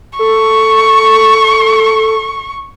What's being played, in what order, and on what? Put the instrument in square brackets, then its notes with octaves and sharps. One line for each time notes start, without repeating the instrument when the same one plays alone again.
[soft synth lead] A4 [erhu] C#6